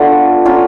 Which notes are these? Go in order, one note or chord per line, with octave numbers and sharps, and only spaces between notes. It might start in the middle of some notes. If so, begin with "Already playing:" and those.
Already playing: A3 B3 D4 F4 F#5
A#3 C#4 F4 F5